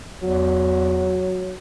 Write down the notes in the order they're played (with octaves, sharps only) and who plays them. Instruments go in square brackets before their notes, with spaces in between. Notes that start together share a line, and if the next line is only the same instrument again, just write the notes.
[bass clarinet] E2 [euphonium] F#3